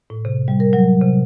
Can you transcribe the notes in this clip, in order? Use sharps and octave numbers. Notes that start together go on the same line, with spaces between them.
A2
C3
G3
A#4
F#3
C3